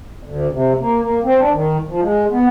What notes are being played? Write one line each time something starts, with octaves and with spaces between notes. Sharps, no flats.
D2
C3
A#3
A#3
C4
D4
D#3
F3
G#3
B3